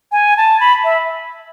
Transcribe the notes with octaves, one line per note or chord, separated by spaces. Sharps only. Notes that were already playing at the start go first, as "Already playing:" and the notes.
G#5
A5
B5
E5